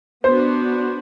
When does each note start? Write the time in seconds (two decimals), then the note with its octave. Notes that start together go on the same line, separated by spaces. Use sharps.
0.24 B3 D4 F#4 C5